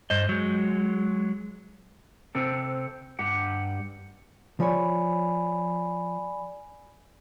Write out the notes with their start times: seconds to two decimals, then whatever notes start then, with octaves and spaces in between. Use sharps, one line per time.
0.10 G2 C5 D#5
0.29 F#3 G#3
2.35 C3 C4 A4
3.19 G2 G4 F#5
4.60 F3 C#5 D5 G#5 B5